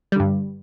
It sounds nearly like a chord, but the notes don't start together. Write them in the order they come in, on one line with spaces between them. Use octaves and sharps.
G3 D3 G2